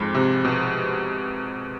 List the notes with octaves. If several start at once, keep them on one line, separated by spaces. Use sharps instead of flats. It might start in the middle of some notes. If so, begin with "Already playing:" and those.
Already playing: F2 G#2
C3
B2